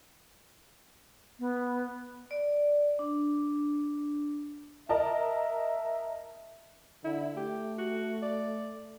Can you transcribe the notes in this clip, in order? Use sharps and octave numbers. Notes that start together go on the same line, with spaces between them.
B3
D5
D4
A#4 D#5 E5 A5
D3 E4
A3 G4
F#4
D5